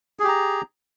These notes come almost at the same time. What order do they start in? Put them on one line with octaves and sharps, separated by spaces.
G#4 G4 A#5